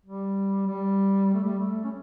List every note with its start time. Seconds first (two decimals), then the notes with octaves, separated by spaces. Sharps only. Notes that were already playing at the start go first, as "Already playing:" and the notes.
0.05 G3
0.67 G3
1.34 A3
1.44 G3
1.59 A3
1.84 C#4